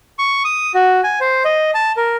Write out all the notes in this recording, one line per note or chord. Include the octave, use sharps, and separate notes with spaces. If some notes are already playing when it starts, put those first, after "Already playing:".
C#6
D#6
F#4
G#5
C5
D#5
A5
A#4